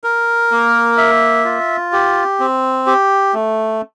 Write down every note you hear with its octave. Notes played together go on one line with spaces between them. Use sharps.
A#4
A#3
E5
F4
G4
C4
G4
A3